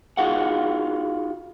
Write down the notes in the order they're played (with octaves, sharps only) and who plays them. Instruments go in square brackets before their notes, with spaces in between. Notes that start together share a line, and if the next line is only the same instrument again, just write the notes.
[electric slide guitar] D#4 F4 F#4 G#4 F5 F#5